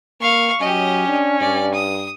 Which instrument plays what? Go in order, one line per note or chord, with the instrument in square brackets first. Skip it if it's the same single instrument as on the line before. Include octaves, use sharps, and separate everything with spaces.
[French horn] A#3 [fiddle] F5 C#6
[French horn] F#3 [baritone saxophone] C#4 [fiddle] G4 D#5
[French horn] D4
[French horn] G2 [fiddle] D5
[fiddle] D#6